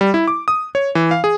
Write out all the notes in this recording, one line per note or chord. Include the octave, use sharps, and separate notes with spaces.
G3
E4
D6
D#6
C#5
E3
F5
G#4